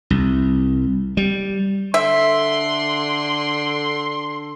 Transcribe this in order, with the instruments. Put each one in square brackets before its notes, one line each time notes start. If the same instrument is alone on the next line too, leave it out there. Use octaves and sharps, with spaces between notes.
[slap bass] C2
G3
[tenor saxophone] D3 [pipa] E5 [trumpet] C6